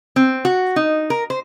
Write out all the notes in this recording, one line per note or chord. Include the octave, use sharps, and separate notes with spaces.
C4
F#4
D#4
A#4
C5